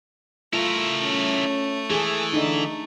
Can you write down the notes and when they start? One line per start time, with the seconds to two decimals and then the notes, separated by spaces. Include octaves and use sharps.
0.53 A3 E4 F4 A#4
1.03 C#4
1.90 E3 G#4 A4
2.33 D3 D#4